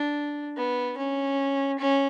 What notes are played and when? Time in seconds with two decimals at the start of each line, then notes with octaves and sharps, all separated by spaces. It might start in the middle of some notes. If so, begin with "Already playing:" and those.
Already playing: D4
0.57 B3
0.97 C#4
1.79 C#4